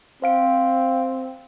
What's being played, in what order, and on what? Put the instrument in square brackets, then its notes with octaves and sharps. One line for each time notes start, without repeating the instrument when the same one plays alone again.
[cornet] C4 [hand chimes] C5 F5 D7